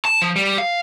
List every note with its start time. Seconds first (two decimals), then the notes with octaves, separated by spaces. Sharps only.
0.05 A5
0.22 F3
0.36 G3
0.58 F5